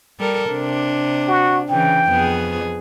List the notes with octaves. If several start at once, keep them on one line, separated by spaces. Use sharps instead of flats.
G3 A4 A#4
C3 D4
F#4
C#3 E3 G5
F2 B3 G#4